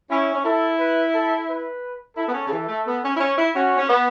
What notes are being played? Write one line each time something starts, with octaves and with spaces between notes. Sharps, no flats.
C#4 E4
C#4
E4 A4
B4
A4
B4
E4 A4
B3
C#4
C#3
E3
A3
B3
C#4
E4
C#4
E4
C#4 F#4
C#4
B3